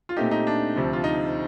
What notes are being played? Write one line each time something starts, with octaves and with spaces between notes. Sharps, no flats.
F4
A#2 A3 C4 D#4 G4
D#4 G4
D4
D2 C3 F3
F4
D#4